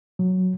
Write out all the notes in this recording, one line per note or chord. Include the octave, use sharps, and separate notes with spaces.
F#3